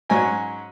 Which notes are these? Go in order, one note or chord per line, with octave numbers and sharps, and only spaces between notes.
G#2 F#3 C#4 G#5